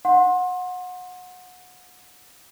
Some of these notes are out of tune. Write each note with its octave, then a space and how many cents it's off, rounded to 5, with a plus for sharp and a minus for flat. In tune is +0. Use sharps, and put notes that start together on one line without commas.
F#5 -25 C6 +25